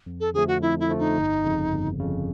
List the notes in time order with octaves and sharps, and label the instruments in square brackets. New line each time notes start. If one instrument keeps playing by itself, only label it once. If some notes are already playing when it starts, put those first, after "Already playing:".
[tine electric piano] F2
[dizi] A4
[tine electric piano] D3 F3 A3 [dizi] G#4
[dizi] F#4
[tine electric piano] F2 [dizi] E4
[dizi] E4
[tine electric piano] D3 F3 A3
[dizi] D#4
[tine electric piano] G1
F2 C#3
G1
F2 C#3